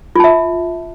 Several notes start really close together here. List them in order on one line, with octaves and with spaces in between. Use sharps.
F4 A5 E5